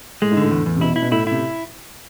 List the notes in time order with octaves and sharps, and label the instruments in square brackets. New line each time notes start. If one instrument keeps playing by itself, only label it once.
[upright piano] A2 [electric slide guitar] G#3
[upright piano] G#2
[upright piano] A2 [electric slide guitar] D3
[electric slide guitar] E2
E2
[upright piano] C3
[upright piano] B2 [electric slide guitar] E4
[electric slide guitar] E4
[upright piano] B2
[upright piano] A2 [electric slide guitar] E4
[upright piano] C3 [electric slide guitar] E4